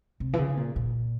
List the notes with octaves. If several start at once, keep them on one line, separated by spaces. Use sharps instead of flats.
C3
E3
C#3
A#2
A#2